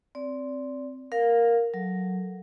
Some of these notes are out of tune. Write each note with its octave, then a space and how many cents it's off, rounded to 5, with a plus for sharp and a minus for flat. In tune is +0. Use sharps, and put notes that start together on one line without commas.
C4 +0 D5 -25
A#4 +0 F5 +15
F#3 +0 A4 +0